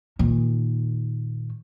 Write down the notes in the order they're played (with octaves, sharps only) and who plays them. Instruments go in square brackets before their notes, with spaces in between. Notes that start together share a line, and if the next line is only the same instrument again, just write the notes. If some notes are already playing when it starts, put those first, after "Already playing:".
[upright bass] A#2 D#3